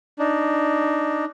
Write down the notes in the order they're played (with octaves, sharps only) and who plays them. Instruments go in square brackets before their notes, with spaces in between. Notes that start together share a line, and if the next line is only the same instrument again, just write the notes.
[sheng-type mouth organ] D4 D#4